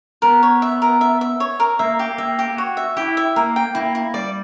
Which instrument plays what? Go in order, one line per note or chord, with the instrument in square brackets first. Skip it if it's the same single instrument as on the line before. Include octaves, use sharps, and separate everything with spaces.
[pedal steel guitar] B3 [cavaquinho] A#4
[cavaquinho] C#5
E5
A#4
E5
E5
C#5
A#4
[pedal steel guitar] A#3 [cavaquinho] E5
[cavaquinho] G4
[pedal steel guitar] A#3 [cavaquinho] E5
[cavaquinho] G4
[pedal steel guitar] F#4 [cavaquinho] C#5
[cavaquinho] E5
[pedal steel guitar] E4 [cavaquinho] G4
[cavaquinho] E5
[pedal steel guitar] A#3 [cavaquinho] A#4
[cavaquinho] G5
[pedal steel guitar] A#3 [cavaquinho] E4
[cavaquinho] E4
[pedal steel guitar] G3 [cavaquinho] D5